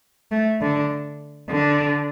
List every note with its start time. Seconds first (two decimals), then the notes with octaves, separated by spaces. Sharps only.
0.31 A3
0.61 D3
1.50 D3